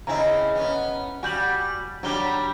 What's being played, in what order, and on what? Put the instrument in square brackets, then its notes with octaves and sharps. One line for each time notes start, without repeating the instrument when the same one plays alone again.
[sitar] C#3 C4 E4 [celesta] D#5 G#5 A#5
[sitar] B3 C#4
[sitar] G3 F#4 [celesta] G#5 G6 F#7
[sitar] F#3 G3 G4 [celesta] D4 C#5 G7